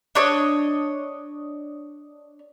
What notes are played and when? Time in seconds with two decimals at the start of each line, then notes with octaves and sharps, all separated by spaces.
0.15 D4 C#5 D#5